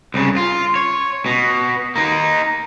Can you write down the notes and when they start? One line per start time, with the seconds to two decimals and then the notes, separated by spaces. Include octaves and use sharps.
0.14 C2 C#3
0.37 F4
0.76 C#5
1.26 B2
1.96 A#3 D#4